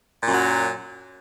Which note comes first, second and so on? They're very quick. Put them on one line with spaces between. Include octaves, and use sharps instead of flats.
A#2 F#2 F#3